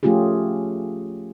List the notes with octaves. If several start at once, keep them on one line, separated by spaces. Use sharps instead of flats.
F3 A3 C#4 F4 G4 G#4